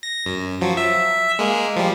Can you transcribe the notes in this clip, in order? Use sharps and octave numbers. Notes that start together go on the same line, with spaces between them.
A#6
F#2
F3 F#3
E5
G#3 A#3
F3 G3